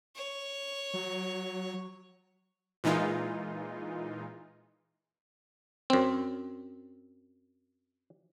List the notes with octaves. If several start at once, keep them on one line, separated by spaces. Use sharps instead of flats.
C#5
F#3
A#2 E3 G#3 D#4 F4
F#2 C4